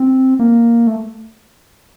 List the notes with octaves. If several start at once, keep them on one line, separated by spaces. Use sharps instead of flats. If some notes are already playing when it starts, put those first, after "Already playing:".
Already playing: C4
A#3
A3